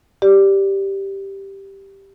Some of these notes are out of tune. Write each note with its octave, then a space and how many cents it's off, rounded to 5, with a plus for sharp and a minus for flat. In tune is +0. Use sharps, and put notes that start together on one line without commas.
G4 +0 D5 +0